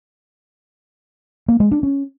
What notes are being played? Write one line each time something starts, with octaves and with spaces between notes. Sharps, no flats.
A#3
G#3
D4
C#4